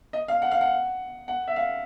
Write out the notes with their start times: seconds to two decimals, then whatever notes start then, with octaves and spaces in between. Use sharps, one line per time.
0.13 D#5
0.28 F5
0.42 F#5
0.51 F5
0.61 F#5
1.28 F#5
1.48 E5
1.56 F5